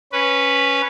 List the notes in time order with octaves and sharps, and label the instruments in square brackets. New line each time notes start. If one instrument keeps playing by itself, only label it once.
[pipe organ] C#4 B4